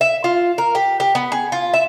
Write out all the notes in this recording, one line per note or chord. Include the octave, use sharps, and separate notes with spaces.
E5
F4
A#4
G4
G4
B3
G#4
F4
E5